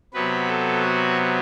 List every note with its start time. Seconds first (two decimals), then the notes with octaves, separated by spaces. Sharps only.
0.13 C3 F#3 B3 B4
0.47 A4
0.82 F#4